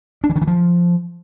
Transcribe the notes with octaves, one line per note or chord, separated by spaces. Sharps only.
D4
E3
D#3
E3
F3